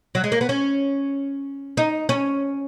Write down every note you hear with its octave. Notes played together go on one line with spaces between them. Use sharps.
F#3
G#3
A#3
B3
C#4
D#4
C#4